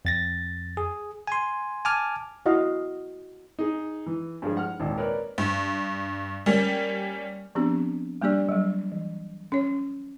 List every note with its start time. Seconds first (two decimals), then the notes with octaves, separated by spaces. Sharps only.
0.05 F2 A6 A#6
0.77 G#4
1.27 G#5 C6
1.85 G#5 A5 D6 F6
2.46 E4 F#4 D#5 F5
3.59 D#4 G#4
4.06 E3
4.42 G2 F3 G#3
4.57 F#5 F6
4.80 G#1 D#2 A#2
4.98 A#4 B4 C#5 D5
5.38 G2
6.46 G3 A#3 C#4
7.55 F3 B3 C4 D4 G4
8.22 G3 A#3 D4 G4 D5
8.49 F#3 G3
8.92 E3
9.52 C#4 C#5